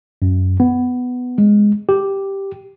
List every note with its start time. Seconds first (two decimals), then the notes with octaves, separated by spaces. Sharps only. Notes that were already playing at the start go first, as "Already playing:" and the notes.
0.22 F#2
0.60 B3
1.38 G#3
1.89 G4